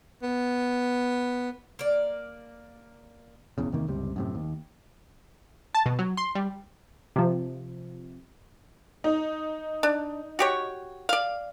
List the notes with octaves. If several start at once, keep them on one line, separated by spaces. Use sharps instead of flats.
B3
A#3 D5
F#1 B1 E2 C#3
E2 C3 D#3 A#3
G1 C#2 C3 G3
F#2 A2 C3
D#2
A5
B2
F#3
C6
G3
C3 F3
D#4
D4
F#4 G4 C#5
D5 F5